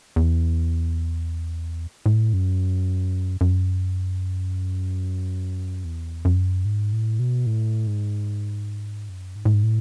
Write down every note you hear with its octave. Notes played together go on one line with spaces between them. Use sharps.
E2
A2
F#2
F#2
E2
F#2
G#2
A2
B2
A2
G#2
F#2
G#2
A2
G#2
A2